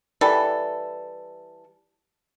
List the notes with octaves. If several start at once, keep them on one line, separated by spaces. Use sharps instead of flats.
E3 G3 E4 A4